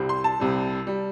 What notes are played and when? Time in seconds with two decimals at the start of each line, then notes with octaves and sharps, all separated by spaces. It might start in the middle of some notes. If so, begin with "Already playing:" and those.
Already playing: C2 C3 G3
0.09 C6
0.24 A5
0.40 C2 C3 G3
0.87 G3